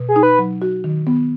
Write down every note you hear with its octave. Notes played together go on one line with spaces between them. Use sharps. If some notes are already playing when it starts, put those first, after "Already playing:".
Already playing: B2
G#4
D#4
B4
F#3
F#4
D#3
B3